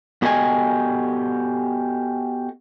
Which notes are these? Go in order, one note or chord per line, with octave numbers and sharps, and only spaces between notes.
B3 F#4 G4 A4 D#5 G#5